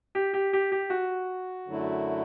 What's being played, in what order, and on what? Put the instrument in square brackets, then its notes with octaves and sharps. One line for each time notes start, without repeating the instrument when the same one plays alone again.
[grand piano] G4
G4
G4
G4
F#4
[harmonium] F#2 D3 F#3 A3 E4